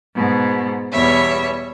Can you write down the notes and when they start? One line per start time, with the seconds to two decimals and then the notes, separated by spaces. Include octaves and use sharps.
0.14 G#2 B2
0.91 E2 B2 G3 C#5 E5